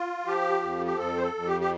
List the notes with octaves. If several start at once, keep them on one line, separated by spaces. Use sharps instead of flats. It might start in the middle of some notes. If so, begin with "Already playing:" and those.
Already playing: F4
F3 G4
F2
G4
F2 A4
C5
A4
F2
G4
G4